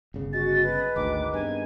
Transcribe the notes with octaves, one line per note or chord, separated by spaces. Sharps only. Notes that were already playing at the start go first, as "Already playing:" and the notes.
G1 C#3
G#3 F#4 A6
B4
G#1 D2 D#3 D6
G2 B3 C4 G#5